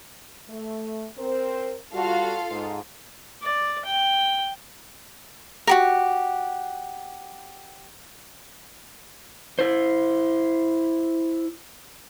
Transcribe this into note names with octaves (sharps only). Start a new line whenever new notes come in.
A3
C4 A#4 C5
G3 F4 F#4 A4 F5
G#2
D5
G5
F#4 G4 A#4
E4 C5